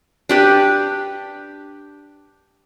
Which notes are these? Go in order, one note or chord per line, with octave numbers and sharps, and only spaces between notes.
D4 G4 B4